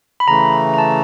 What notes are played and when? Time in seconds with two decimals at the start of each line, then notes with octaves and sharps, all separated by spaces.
0.20 B5
0.28 C#3 E3 A3 A#5
0.53 A#5
0.74 A#5
0.78 A5